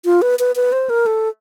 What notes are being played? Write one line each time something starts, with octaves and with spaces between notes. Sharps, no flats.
F4
B4
B4
B4
C5
A#4
A4